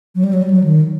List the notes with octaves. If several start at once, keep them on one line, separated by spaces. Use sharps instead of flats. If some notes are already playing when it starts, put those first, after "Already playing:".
F#3
G3
F#3
G3
F#3
D#3